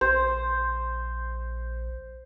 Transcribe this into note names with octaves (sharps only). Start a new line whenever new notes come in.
A#1 C5